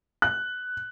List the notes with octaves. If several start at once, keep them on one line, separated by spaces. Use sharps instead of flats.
F#6